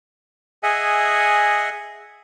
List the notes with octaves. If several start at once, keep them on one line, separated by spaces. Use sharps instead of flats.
G#4 D#5 E5 F#5 G#5